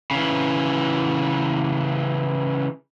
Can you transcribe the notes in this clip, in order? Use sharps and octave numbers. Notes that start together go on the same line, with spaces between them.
C#3 E3